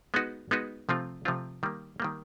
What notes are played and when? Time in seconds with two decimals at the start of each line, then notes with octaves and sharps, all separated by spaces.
0.14 G#3 B3 D#4 F#4 B4
0.51 G#3 B3 D#4 F#4 B4
0.89 C3 F3 A3 C4 F4
1.25 C3 F3 A3 C4 F4
1.63 D#3 G3 A#3
2.00 D#3 G3 A#3